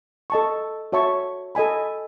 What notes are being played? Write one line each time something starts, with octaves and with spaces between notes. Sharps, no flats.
A4 D#5 A5 C#6
F#4 C#5 E5 A5 C#6
A4 D#5 G#5 B5